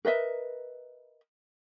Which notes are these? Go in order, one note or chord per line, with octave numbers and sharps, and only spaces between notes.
A#4 B4 D#5 E5